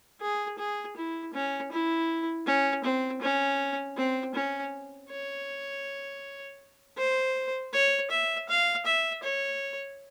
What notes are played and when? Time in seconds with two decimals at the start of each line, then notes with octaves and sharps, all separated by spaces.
0.21 G#4
0.59 G#4
0.97 E4
1.34 C#4
1.72 E4
2.47 C#4
2.84 C4
3.22 C#4
3.97 C4
4.35 C#4
5.10 C#5
6.98 C5
7.73 C#5
8.11 E5
8.49 F5
8.86 E5
9.23 C#5